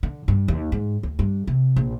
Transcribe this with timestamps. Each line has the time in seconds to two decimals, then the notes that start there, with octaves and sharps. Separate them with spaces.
0.03 D3
0.28 G2
0.48 D#2
0.72 G#2
1.03 D2
1.19 G2
1.47 C3
1.76 A#1